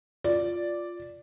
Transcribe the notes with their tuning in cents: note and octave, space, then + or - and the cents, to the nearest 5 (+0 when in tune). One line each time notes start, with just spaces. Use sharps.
F4 +0 D5 -5